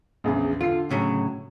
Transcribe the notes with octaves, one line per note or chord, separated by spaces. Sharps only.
A#1 E2 C#3
D3 F4 C7
A2 C#3 F#3